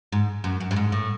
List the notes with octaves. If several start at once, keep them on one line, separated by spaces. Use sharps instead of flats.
G#2
F#2
F#2
G2
G#2
A2